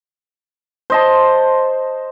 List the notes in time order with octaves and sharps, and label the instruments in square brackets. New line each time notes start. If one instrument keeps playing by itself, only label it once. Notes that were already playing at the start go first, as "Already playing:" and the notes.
[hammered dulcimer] C5 D#5 A5